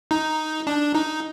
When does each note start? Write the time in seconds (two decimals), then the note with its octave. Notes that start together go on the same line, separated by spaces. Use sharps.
0.11 D#4
0.67 D4
0.95 D#4